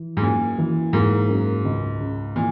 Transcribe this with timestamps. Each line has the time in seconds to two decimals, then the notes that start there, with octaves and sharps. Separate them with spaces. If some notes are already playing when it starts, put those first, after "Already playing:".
Already playing: E3
0.17 G#2
0.22 F#2 A#2
0.58 E3
0.93 G#2 A#3
1.29 F#2
1.65 C#2
2.00 C#3
2.36 A#2 E3